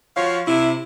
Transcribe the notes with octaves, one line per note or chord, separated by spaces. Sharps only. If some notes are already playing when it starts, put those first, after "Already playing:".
F3 F4 F#4 C#5 F5
C3 E4